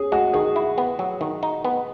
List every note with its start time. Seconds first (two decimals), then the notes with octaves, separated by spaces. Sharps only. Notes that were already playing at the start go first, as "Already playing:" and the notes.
Already playing: C#4 G#4
0.12 G#3 F#4
0.33 D#3 G#4
0.56 E4
0.78 B3
0.99 F#3
1.21 D#3
1.43 D#4
1.65 B3